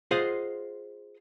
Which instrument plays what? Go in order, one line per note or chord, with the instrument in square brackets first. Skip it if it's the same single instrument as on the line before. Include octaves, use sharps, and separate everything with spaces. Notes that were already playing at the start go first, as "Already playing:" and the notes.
[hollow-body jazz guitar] F4 G#4 C5 D#5 F5 F#5